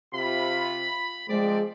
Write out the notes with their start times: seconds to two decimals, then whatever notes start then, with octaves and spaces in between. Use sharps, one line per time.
0.14 C3 F4 B5
1.29 F3 G#3 C4 D5